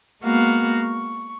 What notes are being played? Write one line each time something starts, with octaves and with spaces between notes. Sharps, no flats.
G#3 A#3 B3 F#4 F5
C#6